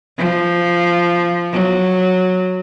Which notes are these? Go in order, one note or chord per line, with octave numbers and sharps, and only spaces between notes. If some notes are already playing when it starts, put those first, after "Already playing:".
F3
F#3